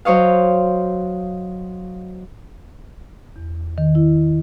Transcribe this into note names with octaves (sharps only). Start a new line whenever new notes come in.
F#3 C5 C#5 D#5 F5
E2
D#3
E4